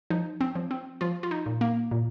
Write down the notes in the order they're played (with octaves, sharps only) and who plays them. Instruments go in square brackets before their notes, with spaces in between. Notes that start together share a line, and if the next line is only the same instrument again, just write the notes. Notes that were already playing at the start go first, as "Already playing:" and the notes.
[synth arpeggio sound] F3 D#4
C4
F3
C4
F3 F4
F4
D#4
A#2
A#3
A#2